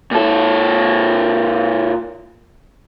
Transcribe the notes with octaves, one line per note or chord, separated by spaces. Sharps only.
A#2 A4